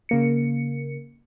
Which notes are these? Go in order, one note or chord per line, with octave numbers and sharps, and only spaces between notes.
C#3 A#3 C#7